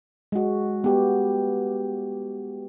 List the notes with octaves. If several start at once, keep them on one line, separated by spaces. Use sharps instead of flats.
G#3 F#4
B3 G4